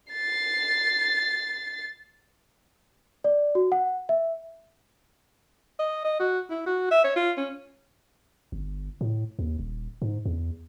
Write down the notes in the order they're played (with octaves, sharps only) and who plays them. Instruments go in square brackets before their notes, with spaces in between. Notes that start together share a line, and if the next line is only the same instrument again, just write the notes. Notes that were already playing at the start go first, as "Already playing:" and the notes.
[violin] A6 C7
[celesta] D5
F#4
F#5
E5
[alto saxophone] D#5
D#5
F#4
E4
F#4
E5
C#5
F4
C#4
[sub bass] G1
A2
D#2
D#1
G#2
E2